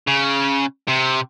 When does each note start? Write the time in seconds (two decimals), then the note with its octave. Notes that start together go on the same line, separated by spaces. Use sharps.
0.08 C#3
0.88 C3